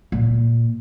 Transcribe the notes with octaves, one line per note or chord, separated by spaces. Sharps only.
A#2